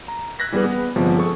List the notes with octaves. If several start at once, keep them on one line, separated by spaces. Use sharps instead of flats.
A#5
E6 F#6 G#6 A#6 B6
E3 G3 B3 G#4 B4
B3
G1 C3 F3 G#3 B3
G#4 A4 C#6